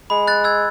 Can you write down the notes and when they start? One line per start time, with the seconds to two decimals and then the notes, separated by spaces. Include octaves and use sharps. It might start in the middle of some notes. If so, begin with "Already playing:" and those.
0.10 G#3 B5
0.27 F#6 A6
0.44 E6 G#6